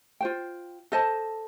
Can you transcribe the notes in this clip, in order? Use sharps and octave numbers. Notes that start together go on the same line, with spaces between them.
F4 C5 G5
A4 C5 D#5 A5